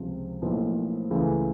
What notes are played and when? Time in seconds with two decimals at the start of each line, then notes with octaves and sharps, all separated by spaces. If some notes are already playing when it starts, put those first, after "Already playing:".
Already playing: C#2 C3 F3
0.42 B1 A2 F3 A#3
1.11 C#2 C#3 E3 A3